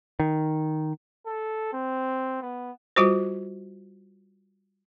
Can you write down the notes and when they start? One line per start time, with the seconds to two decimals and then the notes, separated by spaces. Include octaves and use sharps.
0.20 D#3
1.26 A4
1.73 C4
2.42 B3
2.96 G3 F4 F#4 C5